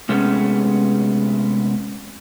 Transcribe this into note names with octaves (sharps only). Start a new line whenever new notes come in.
C3 G#3 A3 B3 C#4